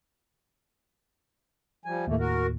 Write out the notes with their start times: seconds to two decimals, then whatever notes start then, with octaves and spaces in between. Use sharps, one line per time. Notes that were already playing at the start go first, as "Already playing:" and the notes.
1.85 F3 G3 G#5
2.07 D#2 A2 A3 A#3
2.19 F#4 A#4